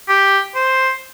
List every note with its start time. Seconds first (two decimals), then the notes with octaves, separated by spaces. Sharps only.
0.09 G4
0.55 C5